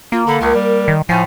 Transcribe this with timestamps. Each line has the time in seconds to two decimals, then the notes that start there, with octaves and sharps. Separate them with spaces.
0.12 A#3 F4
0.27 D3 B5
0.41 C#2 A#4
0.54 G3
0.88 D#3
1.09 A2 F3 G#5